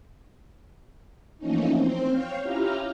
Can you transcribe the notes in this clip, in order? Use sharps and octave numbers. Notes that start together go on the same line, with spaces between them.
E3 F3 A3 A#3 C#4 D#4
C4 C5
C#5 F5 G5
C#4 E4 F4 G4 A#5 F6